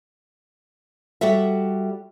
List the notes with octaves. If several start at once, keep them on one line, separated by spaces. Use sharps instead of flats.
G3 F#4 A4 E5